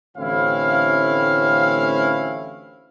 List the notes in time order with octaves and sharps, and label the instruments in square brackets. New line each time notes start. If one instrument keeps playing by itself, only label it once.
[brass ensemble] A1 D2 C4 C#4 E4 F5